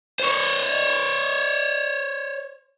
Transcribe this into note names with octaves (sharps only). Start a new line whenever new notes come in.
C5 C#5